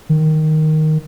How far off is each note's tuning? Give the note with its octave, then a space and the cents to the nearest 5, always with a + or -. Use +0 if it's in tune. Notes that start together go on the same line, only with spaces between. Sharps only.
D#3 +0